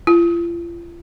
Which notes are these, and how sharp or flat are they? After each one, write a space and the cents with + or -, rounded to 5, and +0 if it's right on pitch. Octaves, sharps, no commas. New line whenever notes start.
F4 -40